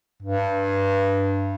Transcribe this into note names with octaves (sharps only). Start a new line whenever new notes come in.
G2